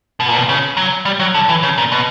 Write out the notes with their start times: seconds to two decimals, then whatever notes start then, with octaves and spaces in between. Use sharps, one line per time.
0.20 B2
0.28 A#2
0.36 B2
0.49 C#3
0.77 F#3
1.05 G3
1.20 F#3
1.35 D3
1.49 E3
1.63 C#3
1.78 A#2
1.92 B2